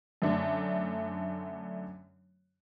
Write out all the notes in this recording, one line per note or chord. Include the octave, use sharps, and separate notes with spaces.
F#2 D3 A3 D4